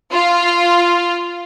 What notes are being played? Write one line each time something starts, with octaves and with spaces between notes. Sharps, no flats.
F4